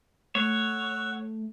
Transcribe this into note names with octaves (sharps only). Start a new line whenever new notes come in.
A3 C#5 F#5 E6